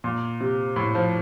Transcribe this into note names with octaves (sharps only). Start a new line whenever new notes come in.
A#2
C3
A2
F3